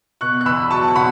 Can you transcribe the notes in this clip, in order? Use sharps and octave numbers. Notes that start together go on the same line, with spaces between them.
B2 C#6 F#6
F#6
E2 B5 E6
F#3 A5 C#6
C#6
B2 F#5 B5